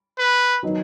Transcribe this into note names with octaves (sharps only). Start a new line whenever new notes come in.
B4
D#3 F#3 B3 D#4